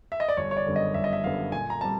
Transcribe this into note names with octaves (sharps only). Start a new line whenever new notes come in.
E5
D#5
D5
G1 C#5
C#5
D5
F#2 D3 G3 B3
D#5
G1 E5
D#5
E5
F#2 D3 G3 B3 F5
A#2 G#5
A#5
G3 C4 A5